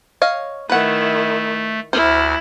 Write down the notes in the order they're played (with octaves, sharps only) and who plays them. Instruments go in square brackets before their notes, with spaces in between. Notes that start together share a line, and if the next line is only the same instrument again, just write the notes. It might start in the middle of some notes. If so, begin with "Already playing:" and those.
[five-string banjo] C#5 D#5 F5
[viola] D#3 E4 [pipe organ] A3 [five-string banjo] B4 F#5
[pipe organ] D2 F6 [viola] E4 [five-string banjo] C5